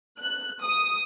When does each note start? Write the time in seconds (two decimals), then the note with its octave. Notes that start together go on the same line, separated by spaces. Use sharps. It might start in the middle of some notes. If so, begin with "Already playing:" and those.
0.19 F#6
0.62 D#6